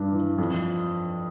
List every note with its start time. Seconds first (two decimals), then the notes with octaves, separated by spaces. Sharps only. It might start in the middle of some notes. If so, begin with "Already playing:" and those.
Already playing: G2 D4
0.12 E3
0.38 F2